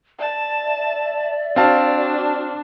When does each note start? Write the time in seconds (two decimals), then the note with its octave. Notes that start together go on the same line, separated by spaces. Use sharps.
0.19 D5 E5 A5
1.56 C4 D4 F#4 F5 A5